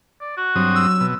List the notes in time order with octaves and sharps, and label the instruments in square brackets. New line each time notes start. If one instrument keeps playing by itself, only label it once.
[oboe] D5
F#4
[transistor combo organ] G2 C4 D#6 [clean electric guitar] F#3
[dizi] E6
[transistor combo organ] B2